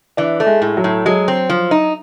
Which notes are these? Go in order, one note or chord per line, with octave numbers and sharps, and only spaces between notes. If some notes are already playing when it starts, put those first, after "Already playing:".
E3 D4
A3
G#3
A2
F#3
A2
F#3 G#3
C4
F3
D#4